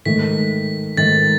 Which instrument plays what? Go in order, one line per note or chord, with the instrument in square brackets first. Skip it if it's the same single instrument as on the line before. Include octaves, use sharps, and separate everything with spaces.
[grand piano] G#2 D#3 A3 [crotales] B6
[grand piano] G#2 D#3 A3 [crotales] A6